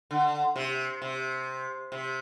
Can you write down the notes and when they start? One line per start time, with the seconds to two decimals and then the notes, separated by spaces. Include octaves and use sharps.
0.11 D3
0.56 C3
1.02 C3
1.92 C3